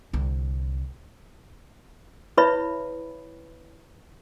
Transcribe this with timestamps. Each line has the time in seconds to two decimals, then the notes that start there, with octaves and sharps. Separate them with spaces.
0.13 C2 D3
2.37 E4 B4 C#5 E5 B5